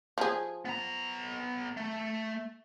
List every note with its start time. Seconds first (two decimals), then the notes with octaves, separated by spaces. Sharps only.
0.18 F3 G#4
0.65 B3 A#5
1.77 A3